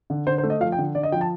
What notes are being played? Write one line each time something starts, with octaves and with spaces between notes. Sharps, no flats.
D3
D3 C5
C5
A3
D#5
F3 F5
G5
D3
D3 D5
D#5
F3 G5
A5